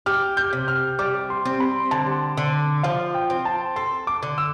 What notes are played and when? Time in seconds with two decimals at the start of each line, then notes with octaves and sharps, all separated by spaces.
0.06 G4 F6
0.37 G6
0.53 C3
0.68 F6
0.99 G3 D6
1.30 C6
1.45 C4
1.60 B5
1.91 D3 A5
2.38 D3
2.83 F3 F5
3.14 G5
3.30 C4
3.45 A5
3.76 A4 C6
4.07 D6
4.23 D3
4.38 E6